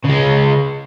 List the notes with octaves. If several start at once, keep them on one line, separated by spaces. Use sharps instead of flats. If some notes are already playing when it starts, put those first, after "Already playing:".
C#3 G#3